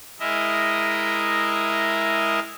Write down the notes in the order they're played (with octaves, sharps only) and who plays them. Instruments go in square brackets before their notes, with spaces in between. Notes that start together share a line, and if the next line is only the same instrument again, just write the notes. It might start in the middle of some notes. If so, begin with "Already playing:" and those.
[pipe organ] G#3 E4 A#4 D#5 E5